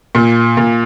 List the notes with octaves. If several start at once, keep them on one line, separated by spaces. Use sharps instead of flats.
A#2
A#2